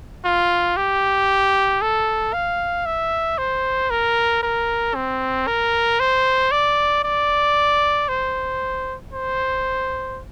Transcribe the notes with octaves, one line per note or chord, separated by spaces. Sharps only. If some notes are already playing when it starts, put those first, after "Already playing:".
F4
G4
A4
F5
E5
C5
A#4
A#4
C4
A#4
C5
D5
D5
C5
C5